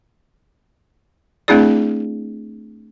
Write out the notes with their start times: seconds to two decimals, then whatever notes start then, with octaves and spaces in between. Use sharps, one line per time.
1.48 A3 C4 D4 E4 G#4 D5